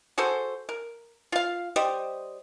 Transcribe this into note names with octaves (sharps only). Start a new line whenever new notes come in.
F#4 G#4 A4 C5
A#4
F4 F5
G3 G4 C5 D#5